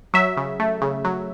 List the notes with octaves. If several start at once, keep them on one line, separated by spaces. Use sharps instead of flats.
F#3 E5
C#3
A3
C#3
F#3